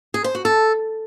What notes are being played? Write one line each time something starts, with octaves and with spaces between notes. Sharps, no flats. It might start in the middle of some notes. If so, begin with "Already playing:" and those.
G#4
C5
F#4
A4